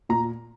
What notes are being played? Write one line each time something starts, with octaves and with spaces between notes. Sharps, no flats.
A#2 A#5